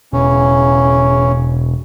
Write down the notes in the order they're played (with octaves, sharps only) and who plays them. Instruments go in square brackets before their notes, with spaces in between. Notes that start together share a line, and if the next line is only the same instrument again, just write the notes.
[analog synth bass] E1 [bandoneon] C#3 E3 C#4